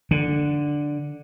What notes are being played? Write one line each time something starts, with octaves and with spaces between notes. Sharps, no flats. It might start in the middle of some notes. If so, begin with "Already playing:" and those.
D3